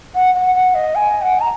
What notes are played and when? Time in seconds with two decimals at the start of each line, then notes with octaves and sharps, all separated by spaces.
0.15 F#5
0.34 F#5
0.55 F#5
0.75 D#5
0.95 G#5
1.22 F#5
1.40 A#5